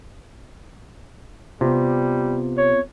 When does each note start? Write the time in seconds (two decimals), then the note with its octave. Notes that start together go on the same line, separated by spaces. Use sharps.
1.61 C3 G3 B3 C4 F4
2.58 C#5